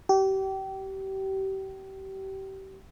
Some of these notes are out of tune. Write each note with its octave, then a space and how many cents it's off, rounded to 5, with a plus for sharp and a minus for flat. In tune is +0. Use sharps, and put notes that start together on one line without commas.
G4 -30